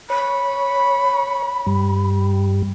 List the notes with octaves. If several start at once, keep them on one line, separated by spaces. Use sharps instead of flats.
C#5 B5
G2 G3